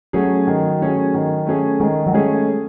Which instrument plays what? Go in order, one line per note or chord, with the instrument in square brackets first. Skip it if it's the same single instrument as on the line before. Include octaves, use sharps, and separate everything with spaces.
[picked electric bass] F#3 [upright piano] A3 C#4 G#4
[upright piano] D#3
A3 C#4 G#4
D#3
A3 C#4 G#4
[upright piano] D#3 [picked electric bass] G#3
[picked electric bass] F#3
[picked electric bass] G#3 [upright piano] A3 C#4 G#4